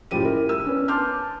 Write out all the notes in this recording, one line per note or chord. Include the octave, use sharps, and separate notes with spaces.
F#1 A2 F3 G4 D#7
E4 A#4
E6
B3 C#4 D4
A5 C6 D6 F6 G6